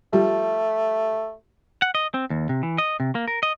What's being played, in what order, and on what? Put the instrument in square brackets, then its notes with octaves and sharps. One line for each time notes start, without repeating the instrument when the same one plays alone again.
[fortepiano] F3 G3 [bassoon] A3
[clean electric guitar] F#5
D#5
C4
D#2
C3
E3
D#5
C3
A#3
A#4
D#5